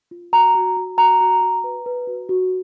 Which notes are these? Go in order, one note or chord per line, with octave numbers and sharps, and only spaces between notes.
F4
F#4 A#5
F#4
F#4
F#4 A#5
F#4
F#4
B4
B4
F#4
F#4